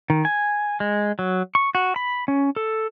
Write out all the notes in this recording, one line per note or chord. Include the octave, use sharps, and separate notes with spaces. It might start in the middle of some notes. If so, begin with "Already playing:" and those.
D#3
G#5
G#3
F#3
C#6
F#4
B5
C#4
A4